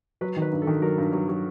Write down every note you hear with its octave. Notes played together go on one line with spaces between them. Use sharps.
F#3 B4
D#3
B4
G2
A4
D#3
F#3 A#4
G2
F#3
F#3